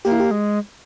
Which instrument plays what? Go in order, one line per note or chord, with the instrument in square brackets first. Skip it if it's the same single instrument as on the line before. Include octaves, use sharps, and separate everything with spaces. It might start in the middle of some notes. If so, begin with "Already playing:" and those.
[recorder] A#3 [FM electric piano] G4
[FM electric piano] E4
G4
[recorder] G#3